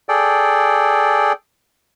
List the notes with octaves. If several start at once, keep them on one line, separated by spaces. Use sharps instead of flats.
G#4 A4 D5 G5